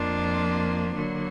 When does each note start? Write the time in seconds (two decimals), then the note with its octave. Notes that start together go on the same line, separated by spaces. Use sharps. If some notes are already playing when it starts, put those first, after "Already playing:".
Already playing: F2 F3 A#3 D4 F4
0.95 D3 F#3 A#3